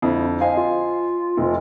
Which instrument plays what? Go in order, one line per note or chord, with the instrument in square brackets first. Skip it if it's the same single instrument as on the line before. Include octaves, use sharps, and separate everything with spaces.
[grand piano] F2 D3 F3 [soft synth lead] E4
[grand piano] C5 D#5 G#5 [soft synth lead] F5
[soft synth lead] F4
[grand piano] F1 F3